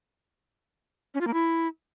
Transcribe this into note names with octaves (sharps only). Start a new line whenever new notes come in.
C#4
F4
A#3
E4